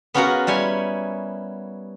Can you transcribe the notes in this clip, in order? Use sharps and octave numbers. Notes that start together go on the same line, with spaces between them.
B3 C#4 F4 F#4 A#4 F#5
G3 E4 C#5 G#5